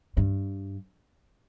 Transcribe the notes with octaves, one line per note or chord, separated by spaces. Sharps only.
G2